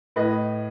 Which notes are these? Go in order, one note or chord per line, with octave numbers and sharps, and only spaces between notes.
A2 B4 D#5